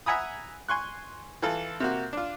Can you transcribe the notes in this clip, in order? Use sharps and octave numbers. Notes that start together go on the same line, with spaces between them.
E5 F#5 G#5 A#5 B5 D#6
G#5 C6 C#6 F#6
E3 F4 A4
C3 A#3 F#4
D4 F4